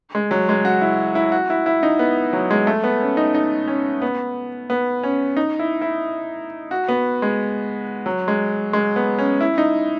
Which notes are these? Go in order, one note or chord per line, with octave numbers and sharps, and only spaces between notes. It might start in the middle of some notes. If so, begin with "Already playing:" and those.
G#3
F#3
G#3
F#4
E4
E4
F#4
E4
E4
D#4
B3
F#3
G#3
A3
B3
C#4
D#4
D#4
C#4
B3
B3
C#4
D#4
E4
E4
F#4
B3
G#3
F#3
G#3
G#3
B3
C#4
E4
D#4